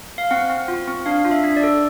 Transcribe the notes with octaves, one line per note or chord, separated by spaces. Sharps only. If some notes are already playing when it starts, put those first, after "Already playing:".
F5
C4 F#5
C4
F4
C4
D4 F5
F4
E5
D4
D5
A4